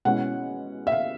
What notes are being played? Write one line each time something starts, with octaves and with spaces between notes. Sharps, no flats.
B2 G#3 C#4 E4 F#5
E5
F5